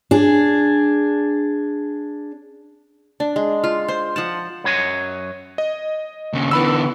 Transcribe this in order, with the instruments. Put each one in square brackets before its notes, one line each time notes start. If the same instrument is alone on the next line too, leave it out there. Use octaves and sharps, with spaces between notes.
[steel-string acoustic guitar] D4 G#4
[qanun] D4
G#3
F4
C5
F3 F#5 A5
[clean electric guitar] F#2 F#3 C#5 D#5 G#5
[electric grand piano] D#5
[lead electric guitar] D#2 C#3
[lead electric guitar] D3 E3 [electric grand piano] B3 B5 E6